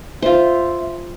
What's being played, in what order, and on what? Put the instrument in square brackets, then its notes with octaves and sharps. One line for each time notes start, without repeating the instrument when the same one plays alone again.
[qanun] F4 C5 [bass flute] E5